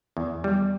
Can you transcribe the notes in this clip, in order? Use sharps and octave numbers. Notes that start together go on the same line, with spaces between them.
E2
G3